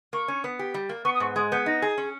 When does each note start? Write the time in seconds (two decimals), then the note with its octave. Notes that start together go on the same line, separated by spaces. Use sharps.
0.13 A#3 C#6
0.28 C#4
0.44 B3
0.59 G4
0.74 G3
0.89 A#3
1.04 B3 C#6
1.14 D#6
1.20 G#2 C#6
1.36 G#3 D#6
1.52 B3 G6
1.66 D#4 A#6
1.82 G#4
1.98 C#4